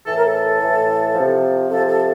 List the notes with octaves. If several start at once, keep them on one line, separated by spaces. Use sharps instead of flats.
A2 E3 A4
A#4
A4
A2 E3
C3 F3
C3 F3 A4
A4